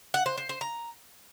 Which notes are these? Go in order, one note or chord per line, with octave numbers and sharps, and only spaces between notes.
F#5
C5
C5
C5
A#5